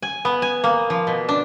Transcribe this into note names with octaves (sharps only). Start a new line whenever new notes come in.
G#5
B3
G#5
A#3
F3
B2
D4